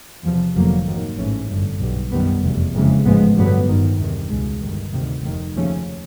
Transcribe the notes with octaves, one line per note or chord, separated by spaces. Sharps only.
E2 C3 F3
F1 F2 D3 F#3 A#3
G#2 D#3 F#3 A#3
A1 G#2 E3 A3 C#4
G1 F#2 D3
B1 B2 G3
F#2 D#3 G3 B3
F1 E2 B2
F#1 F2 C#3 E3 G#3
A1 G#2 F3 G#3 B3
G2 D3 F#3 B3
G1 G2 D#3
E2 C3 D#3
C#2 B2 G#3
G1 G2 D#3
D2 C3 D#3
F1 D#2 D#3
D#2 C#3 F3 A3 C#4